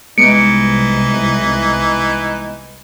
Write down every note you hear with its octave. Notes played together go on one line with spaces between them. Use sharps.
C2 E3 G#3 B3 D#4 C#7 D7